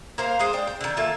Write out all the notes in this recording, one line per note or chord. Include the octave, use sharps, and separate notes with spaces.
A#3 A#4 C5 F5
G#3 G#4 C5
D4 G5
G5
D3 D#3
A#3 F4 A4 E5